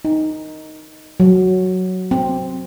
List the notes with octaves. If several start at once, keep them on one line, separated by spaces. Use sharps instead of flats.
D#4
F#3
C4